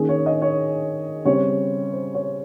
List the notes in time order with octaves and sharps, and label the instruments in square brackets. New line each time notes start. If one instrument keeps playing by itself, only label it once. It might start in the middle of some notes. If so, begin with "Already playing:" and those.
Already playing: [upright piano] D#3 A#3 C#4 G#4
C#5
D#5
C#5
C#3 G3 C4 C#5
C5
C#5